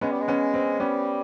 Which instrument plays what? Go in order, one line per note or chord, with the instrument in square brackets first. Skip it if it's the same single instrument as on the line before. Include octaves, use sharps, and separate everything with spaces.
[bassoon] G#3 [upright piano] B3 C#4
[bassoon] G3
G#3
[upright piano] B3 C#4
C4
[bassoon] G3 [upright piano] B3 C#4